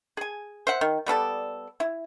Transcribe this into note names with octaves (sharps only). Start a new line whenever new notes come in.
G#4 G#5
C5 E5 F#5
D#3
G3 B3 A4 D5
E4